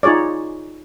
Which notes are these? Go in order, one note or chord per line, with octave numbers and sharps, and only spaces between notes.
D#4 F4 G#4 C#5 D5